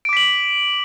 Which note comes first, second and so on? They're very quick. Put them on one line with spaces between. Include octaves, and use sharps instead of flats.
D7 D6 B6 F#7